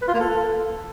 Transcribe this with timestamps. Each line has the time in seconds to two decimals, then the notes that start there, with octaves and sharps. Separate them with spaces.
0.01 B4
0.08 F4
0.14 A#3
0.20 A4